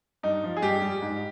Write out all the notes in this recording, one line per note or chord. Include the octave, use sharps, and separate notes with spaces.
G2 D#4
F3
G#4
G2 G4
G3
G#2